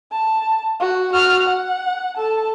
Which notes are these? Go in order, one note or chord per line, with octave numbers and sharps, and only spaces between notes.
A5
F#4
F#4 F6
F#5
A4 A5